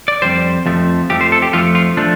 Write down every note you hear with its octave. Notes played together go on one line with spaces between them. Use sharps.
D5
F2 C3 G3 C5
F2 F3 A3
F2 F3 A3 G4
C5
A4
G4
F2 F3 A3 F4
F4
F3 A3 D4